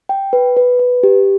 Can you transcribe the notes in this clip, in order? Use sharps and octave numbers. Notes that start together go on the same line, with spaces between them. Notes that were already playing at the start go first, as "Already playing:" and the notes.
G5
B4
B4
B4
G4